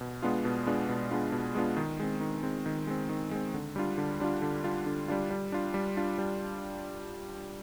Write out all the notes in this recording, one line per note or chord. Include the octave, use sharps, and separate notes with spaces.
B2
G#3 B3 D4 F4
B2
G#3 B3 D4 F4
B2
G#3 B3 D4 F4
B2
G#3 B3 D4 F4
D#3
G#3 C4
D#3
G#3 C4
D#3
G#3 C4
D#3
G#3 C4
D3
G3 D4 F4
D3
G3 D4 F4
D3
G3 D4 F4
D3
G3 D4 F4
G3
D4 F4
G3
D4 F4
G3